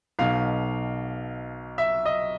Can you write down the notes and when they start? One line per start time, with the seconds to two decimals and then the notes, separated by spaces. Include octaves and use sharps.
0.19 B1 B2 F5
1.78 E5
2.05 D#5